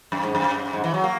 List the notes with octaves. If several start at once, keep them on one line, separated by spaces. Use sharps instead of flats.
F#2
G#2
F#2
G#2
E3
F#3
A#3